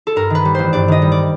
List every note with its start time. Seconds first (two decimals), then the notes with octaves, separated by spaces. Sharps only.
0.07 A4
0.16 G2 A#4
0.30 D#3 B4
0.45 G3
0.55 A1 C5
0.73 G2 D5
0.88 D#3 D#5
1.02 G3
1.12 D5